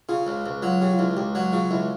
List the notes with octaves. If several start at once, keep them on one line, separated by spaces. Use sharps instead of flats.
C#3 F4
C#2
C#2
F#3 F4
C#3 G4
F4
C#2 E4
C#2 G4
F#3 F#4
C#3 F4
C#2 E4